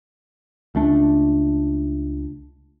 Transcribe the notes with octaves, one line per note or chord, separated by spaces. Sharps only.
C#2 A3 D4